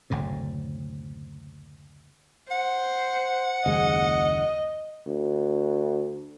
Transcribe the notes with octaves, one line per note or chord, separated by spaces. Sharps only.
F#1 D2 A2 C3
C5 F#5
F#1 D#2 G#3 D#5
D2